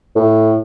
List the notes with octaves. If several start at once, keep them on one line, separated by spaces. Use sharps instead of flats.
A2